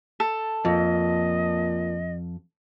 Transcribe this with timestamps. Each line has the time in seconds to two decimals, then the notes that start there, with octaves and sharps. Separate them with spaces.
0.20 A4
0.65 F2 A#2 D#5